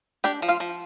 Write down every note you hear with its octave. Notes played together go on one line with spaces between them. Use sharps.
D4 G4 G5
F3
F4 F5
F3